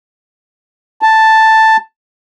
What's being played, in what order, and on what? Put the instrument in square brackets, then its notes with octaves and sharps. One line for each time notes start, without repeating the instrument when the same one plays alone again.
[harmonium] A5